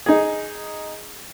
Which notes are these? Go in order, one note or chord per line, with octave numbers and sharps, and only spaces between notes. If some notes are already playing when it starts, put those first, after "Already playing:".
D#4 G#4